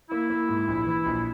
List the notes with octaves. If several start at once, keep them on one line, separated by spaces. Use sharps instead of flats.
A#3 E4
A#3
G#2
A#1
E3
A#1